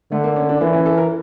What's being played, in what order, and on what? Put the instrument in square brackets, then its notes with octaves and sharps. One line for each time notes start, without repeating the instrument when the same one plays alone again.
[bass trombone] D3 [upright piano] A3
[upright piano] A#3
C#4
D4
[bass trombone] E3 [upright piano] A#3
[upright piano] C#4
A4
A#4